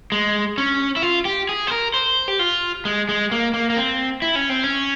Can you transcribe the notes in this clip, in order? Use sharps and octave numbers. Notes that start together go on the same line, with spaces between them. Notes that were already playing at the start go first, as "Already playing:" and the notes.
G#3
C#4
E4
F4
G4
G#4
C5
A#4
C5
G4
F4
G#3
G#3
A#3
A#3
A#3
C4
E4
C#4
C4
C#4